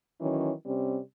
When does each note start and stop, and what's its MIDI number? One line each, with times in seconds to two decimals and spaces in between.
0.20 0.51 51
0.20 0.51 52
0.20 0.51 54
0.20 0.51 61
0.65 0.98 48
0.65 0.98 55
0.65 0.98 60
0.65 0.98 61